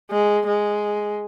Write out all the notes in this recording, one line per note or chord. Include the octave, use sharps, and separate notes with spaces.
G#3
G#3